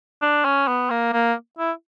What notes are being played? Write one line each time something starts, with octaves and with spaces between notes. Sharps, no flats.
D4
C#4
B3
A#3
A#3
E4